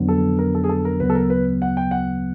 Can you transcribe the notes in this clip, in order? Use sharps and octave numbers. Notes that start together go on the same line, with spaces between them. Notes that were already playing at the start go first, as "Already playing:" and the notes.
Already playing: F2 D3 F#3 B3 D4
A4
A#4
A4
G#4
A4
A#4
D2 C#3 F#3 B3 B4
A4
A#4
B4
F#5
G5
F#5